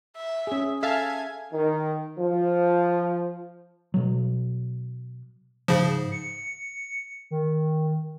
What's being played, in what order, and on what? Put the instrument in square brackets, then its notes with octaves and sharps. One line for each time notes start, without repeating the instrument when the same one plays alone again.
[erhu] E5
[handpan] C#4 G#4
[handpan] A4 [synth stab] E5 F5 A5 [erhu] G#5
[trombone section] D#3
F3
[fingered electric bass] B2 F#3
[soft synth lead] G#2 [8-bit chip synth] C#3 F3
[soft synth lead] C#7
D#3